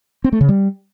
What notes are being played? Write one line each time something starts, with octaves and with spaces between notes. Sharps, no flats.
C4
A3
C#3
G3